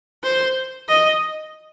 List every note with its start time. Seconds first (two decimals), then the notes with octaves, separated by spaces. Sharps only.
0.24 C5
0.89 D#5